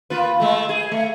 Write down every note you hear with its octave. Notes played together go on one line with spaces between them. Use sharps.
A#3 F4 B4
G#3 A3
G#4
A3